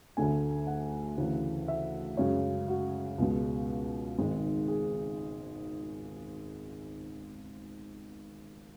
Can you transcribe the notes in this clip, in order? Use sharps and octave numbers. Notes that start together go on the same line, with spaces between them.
D2 D3 A3 G#5
F#5
D2 C#3 E3
E5
F#2 C#3 G#3 C#5
F#4
C#2 B2 G#3
G#1 G#2 G#3 G#4
G#4